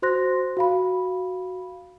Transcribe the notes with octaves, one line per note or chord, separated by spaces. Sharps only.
F#4 C5 C6 F#6 A#6
F#4 F5 B5